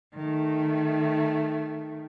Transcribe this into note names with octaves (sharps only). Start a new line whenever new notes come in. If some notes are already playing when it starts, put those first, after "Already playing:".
D#3 A3